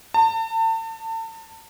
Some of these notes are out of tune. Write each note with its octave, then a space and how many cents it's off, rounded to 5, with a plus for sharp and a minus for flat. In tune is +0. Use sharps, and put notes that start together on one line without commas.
A5 +35